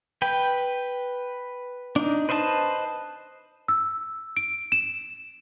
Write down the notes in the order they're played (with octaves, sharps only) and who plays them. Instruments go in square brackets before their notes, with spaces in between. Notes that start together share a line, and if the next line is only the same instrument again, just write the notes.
[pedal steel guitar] B4 G5
D4 D#4
B4 C5 D#5 E5 A5
[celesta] E6
D7
E7